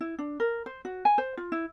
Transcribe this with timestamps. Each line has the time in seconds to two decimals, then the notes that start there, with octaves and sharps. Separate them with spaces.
0.01 E4
0.19 D4
0.40 A#4
0.66 C5
0.85 F#4
1.05 G#5
1.18 C5
1.37 F4
1.52 E4